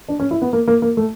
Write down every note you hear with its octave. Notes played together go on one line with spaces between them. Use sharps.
D4
C#4
E4
B3
A#3
A#3
A#3
A3